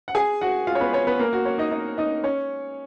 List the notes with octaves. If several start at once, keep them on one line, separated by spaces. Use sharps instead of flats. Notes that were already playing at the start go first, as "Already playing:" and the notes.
F#5
G#4 G#5
F#4 F#5
F4 F5
C#5
B3 B4
C#4 C#5
B3 B4
A#3 A#4
F#4
C#4 C#5
D#4 D#5
D#4 D#5
D#4 D#5
C#4 C#5